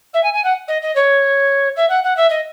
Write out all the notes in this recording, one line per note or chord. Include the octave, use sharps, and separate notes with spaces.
E5
G#5
G#5
F#5
D#5
D#5
C#5
E5
F#5
F#5
E5
D#5